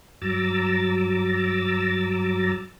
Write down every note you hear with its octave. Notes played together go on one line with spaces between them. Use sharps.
G2 F#3 A#5 D6 E6 A6